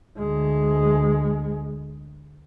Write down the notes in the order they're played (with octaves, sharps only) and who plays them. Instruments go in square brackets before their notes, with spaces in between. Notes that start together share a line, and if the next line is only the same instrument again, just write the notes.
[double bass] D2 G#3